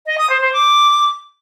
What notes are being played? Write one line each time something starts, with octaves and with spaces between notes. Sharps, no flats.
D#5
D#6
C5
C5
D6